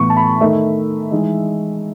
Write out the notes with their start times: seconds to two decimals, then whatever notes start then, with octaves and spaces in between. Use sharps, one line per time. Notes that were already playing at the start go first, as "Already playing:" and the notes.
Already playing: A2 E3 B3 C#6
0.10 A5
0.17 B5
0.41 D#3 A3 D#4 E5
1.11 E3 G#3 D#4